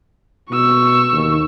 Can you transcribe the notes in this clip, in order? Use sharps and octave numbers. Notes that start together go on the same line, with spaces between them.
B2 C#6 E6
D#2